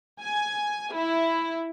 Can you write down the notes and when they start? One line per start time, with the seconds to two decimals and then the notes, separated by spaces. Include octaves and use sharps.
0.22 G#5
0.95 E4